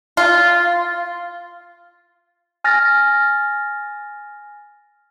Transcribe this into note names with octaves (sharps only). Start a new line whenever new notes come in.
F4
G#5 F6 A6 A#6